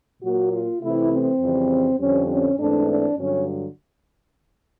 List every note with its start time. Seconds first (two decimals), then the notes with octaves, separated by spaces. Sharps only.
0.22 A#2 F#3 A#3 F#4
0.52 F4
0.82 C3 E3 A3 C4 E4
1.11 C4
1.40 F2 C#3 E3 G3
1.99 F2 D3 G3 C4 C#4
2.29 C#4
2.59 G#2 E3 A3 C4 D4
2.88 D4
3.17 G2 D3 F#3 C#4